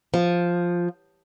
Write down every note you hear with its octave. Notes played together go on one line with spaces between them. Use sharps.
F3